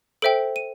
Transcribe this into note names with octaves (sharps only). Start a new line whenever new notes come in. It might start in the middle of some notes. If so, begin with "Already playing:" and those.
A4 C5 E5 G5 D7
D#7